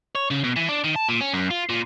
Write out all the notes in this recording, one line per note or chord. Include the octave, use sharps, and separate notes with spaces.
C#5
C#3
B2
E3
D4
D#3
A5
A#2
C#4
F#2
F4
A#2